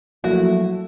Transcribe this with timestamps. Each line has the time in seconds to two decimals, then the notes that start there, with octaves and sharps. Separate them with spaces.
0.24 F3 F#3 A3 A#3 E4 F#4